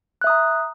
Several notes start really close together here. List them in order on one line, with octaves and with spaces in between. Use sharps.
F#6 E5 D#6 A#5